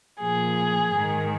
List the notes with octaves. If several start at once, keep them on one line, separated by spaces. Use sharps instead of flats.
A#2 F3 G#4
G#2 D#3